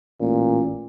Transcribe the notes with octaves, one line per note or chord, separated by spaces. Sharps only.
A1 A#2